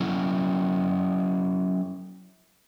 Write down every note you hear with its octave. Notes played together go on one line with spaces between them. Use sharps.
F#3 C#4 E4